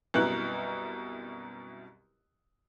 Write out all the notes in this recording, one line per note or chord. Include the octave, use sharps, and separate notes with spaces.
C2 F#2 B2 E4 F#6